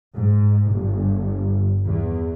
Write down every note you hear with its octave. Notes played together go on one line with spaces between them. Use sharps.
G#2
G1
E2